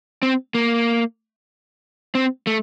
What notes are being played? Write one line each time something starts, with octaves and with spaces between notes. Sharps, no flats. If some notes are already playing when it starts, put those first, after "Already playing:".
C4
A#3
C4
A3